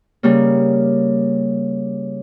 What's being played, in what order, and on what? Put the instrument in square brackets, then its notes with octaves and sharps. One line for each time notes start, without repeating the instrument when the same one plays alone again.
[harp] C#3 G3 A#3